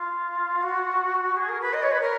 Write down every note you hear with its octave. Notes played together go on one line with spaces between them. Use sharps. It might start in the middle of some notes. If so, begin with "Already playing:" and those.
Already playing: F4
F#4
G#4
A#4
B4
D#5
C#5
B4
A#4